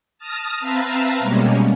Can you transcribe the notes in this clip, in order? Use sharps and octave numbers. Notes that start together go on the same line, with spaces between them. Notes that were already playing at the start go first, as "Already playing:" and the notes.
A5 D#6 F6 A#6
C4 B4 E5 F5 A5 A#5
B2 G3 G#3 A#3 C#4